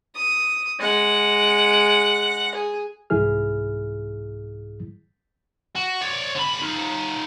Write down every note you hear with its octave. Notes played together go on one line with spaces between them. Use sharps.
D#6
G#3 F#5
G#4
C2 G#2 E3 E4 G#4 F6
F#4
C#5 D5
D3 B5
D#4 F4